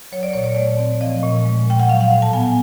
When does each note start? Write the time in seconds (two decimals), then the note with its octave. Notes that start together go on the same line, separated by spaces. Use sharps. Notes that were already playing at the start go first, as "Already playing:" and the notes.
0.12 F#3 C#5
0.23 D5
0.33 A#2 C#5
0.44 D5
0.55 A3 C#5
0.79 C4
1.01 F3 D#5
1.23 A#2
1.45 G#3
1.67 A#2 G5
1.80 F#5
1.89 F#3 F5
2.01 F#5
2.11 A2
2.22 A5
2.33 B3 G#5